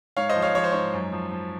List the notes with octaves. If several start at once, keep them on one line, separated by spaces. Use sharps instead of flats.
G#2 C#5 F5
C5 D#5
F3
C#5 F5
F3 C#5
C5
G#2 C#5
F#2
F3
F3